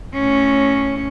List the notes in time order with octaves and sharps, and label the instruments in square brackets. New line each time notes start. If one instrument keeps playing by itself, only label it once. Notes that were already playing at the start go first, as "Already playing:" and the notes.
[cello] A2 C#4